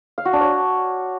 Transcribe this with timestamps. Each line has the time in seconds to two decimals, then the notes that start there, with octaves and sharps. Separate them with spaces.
0.18 F5
0.25 F#4
0.33 D4
0.41 C#5